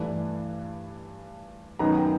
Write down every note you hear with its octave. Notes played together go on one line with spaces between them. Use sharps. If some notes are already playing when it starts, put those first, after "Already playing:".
Already playing: G2 E3 A3 D4
F#2 D#3 F#3 B3 D#4 A#5
G5